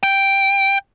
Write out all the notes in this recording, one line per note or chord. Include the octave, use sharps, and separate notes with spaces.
G5